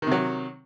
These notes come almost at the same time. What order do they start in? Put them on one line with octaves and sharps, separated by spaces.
D#3 C3 F#3